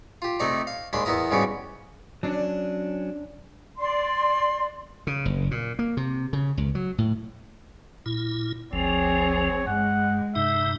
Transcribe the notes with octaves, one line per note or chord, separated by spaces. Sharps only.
F4 G4
C3 A3 D#4 D5 A#5
F5
D#2 G#3 D4 B5 C6
E2 B3 E4 A#4 D#6
G#2 C#3 G3 B3 F#4
F#3 C#4 D4
D5 C6
C#3
F#1
A#2
A#3
C3
C#3
C#2
F#3
A2
A#2 E4
G1 D2 F3 C4 G#4 C#5
G2 G#3 F#5
G2 C3 D#4 E5